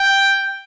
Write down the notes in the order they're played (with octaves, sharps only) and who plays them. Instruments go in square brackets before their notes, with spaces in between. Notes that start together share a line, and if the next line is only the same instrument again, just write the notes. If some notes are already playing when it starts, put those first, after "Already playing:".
Already playing: [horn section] G5